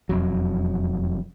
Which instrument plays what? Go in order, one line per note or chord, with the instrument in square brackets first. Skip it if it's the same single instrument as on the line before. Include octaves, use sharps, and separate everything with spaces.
[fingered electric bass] E1 F2 F#3